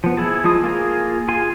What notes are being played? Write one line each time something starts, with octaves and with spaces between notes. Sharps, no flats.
F3 B3
E4 G#4 A5
F3 G#3 F4 D#6
A#3 F4 G#4 A#5
F4 G#4 G#5 C6